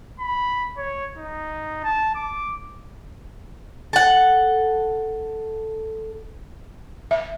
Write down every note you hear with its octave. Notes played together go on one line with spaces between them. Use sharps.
B5
C#5
D#4
A5
D6
A4 F#5
E5